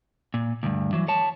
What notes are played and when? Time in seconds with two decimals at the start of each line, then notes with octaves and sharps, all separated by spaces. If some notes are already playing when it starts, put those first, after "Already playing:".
0.34 A#2
0.63 D2 G2
0.93 E3 F#3
1.08 C#5 A5